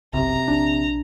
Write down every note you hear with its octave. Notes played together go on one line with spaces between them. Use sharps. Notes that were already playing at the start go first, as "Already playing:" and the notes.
F#1 B1 C3 A#5
A#1 D4